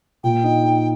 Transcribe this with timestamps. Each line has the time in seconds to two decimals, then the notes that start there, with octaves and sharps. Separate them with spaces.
0.24 A#2 G5
0.44 D#4
0.63 D#4